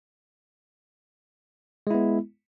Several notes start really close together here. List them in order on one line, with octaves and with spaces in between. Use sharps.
G#3 E4 B3